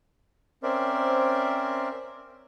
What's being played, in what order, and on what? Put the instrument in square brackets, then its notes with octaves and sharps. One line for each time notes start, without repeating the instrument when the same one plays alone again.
[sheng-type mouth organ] C4 C#4 A#4 C5 D5 E5